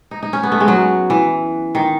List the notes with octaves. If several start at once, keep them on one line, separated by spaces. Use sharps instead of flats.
D#4
D#4
C#4
B3
A3
G#3
F#3
E3
D#3